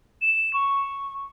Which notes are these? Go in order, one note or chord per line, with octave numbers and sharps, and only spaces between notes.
E7
C#6